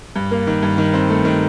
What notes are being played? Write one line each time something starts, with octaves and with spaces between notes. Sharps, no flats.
G2
A#3
D#3
G2
D#3
C4
A3
D#3